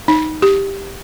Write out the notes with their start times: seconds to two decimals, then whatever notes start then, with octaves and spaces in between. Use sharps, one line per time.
0.08 D#4
0.42 G4